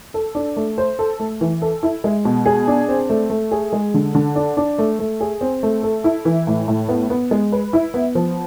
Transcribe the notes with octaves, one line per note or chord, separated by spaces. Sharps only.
A4
D4
A3
C5
A4
A3
E3
A4
E4
G#3
B2
G#4
D4
C4
A3
A3
G#4
G#3
D3
D3
D4
D4
A3
A3
G#4
C4
A3
A4
E4
E3
A2
A2
B3
B3
G#3
B4
E4
B3
F3